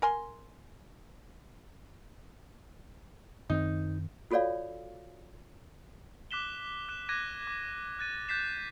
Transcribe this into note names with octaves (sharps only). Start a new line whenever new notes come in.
A#4 G#5 C6
F#2 D#3 C4 D#4
F4 F#4 A4 C#5 D5 F5
D6 F#6 B6 E7 G7
F#6 E7
D6 F#6 G#6 A#6 D#7
D6
F#6 A6 D#7
F#6 G6 A6 B6 C7 E7